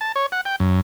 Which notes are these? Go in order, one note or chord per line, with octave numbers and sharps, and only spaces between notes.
A5
C#5
F#5
G5
F#2